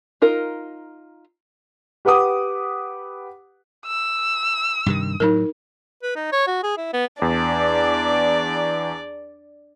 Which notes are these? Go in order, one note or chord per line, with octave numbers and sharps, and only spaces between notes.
D#4 F4 A#4
G4 B4 F#5 D6 D#6
E6
G2 C3 D#3
A2 F#3 D#4 A#4
B4
D#4
C#5
F#4
G#4
E4
B3
E2 D4 D5